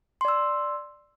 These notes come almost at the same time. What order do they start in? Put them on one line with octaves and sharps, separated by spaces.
C6 D5 E6